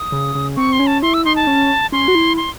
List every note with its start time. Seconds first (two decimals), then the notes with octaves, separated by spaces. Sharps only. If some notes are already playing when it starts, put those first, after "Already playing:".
Already playing: D#6
0.12 C#3
0.35 C#3
0.56 C4 C#6
0.73 C6
0.79 C#4
0.87 A5
1.02 E4 C6
1.14 E6
1.25 D#4 C6
1.36 A5
1.47 C#4
1.92 C#4 C6
2.08 F#4
2.15 E4
2.37 C6